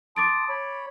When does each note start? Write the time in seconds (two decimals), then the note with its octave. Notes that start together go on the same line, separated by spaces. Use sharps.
0.16 A5 C6 D6 D#6 A6 D7
0.49 C#5 B5